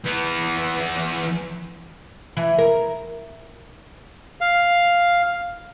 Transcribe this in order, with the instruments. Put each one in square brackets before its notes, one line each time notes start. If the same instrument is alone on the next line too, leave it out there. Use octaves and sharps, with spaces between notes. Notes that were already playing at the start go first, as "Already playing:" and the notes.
[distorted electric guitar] E3 B3
[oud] E3
A#4
[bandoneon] F5